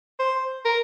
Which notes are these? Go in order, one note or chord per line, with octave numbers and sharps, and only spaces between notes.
C5
A#4